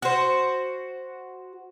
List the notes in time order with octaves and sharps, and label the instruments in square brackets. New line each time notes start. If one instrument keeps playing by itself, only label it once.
[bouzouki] F#4 C5